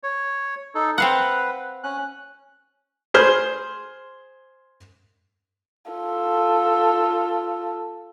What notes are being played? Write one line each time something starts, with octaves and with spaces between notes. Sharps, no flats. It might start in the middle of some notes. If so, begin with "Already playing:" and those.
C#5
D#4 A4
C4 B4 F5 F#5
C#4 F#6
G#4 C5 C6 F6
F4 A4